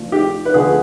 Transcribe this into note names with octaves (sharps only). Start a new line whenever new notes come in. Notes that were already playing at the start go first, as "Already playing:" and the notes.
Already playing: D2 F3
G4
B4
D2 D3 F3 G#4